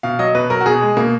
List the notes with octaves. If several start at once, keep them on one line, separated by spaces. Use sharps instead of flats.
B2 F5
F#3 D#5
B2 B4
F#3 A#4
F#4
B2 G#4
G#3
B2 A#3